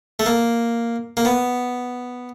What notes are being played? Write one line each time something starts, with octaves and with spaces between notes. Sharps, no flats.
A3
A#3
A#3
B3